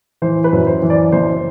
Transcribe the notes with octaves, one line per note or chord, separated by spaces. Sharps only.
E3 C5
B4
F#2
C5
E3
D5
F#1 C5